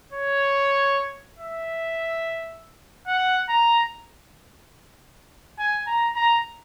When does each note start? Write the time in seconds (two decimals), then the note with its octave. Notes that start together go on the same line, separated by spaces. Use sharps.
0.13 C#5
1.39 E5
3.07 F#5
3.49 A#5
5.59 G#5
5.87 A#5
6.15 A#5